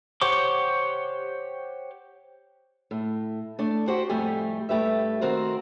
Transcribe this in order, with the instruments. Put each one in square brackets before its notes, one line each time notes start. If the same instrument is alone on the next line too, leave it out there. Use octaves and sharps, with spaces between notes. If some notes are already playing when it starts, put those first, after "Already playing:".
[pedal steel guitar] G4 C5 C#5 F#5 D6
[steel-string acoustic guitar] A2
A3 D4 D5
F#4 G4 C5 F#5
F2 A2 G3 A3 G4 G#5
G2 A3 G4 B4 E5
D#3 C4 F#4 A#4 C5